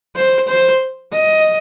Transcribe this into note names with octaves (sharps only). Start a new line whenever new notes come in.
C5
C5
D#5